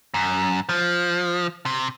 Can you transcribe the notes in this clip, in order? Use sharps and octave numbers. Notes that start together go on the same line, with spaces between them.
F#2
F3
C3